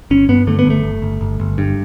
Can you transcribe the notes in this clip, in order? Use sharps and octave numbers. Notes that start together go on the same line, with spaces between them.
G1 C#4
G2 B3
D3 A3
B3
G1 A3
G1
G1
G1
G1
G2